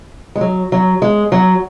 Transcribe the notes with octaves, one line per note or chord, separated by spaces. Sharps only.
G#3
F#3
F#3
G#3
F#3